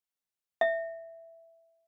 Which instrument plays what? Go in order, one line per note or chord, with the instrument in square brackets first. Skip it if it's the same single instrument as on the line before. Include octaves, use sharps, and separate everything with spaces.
[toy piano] E5